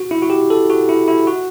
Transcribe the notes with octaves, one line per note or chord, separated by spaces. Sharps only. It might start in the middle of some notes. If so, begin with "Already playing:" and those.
Already playing: F#4
E4
F#4
G4
A4
F#4
E4
E4
F#4